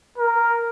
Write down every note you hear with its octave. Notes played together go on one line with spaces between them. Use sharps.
A#4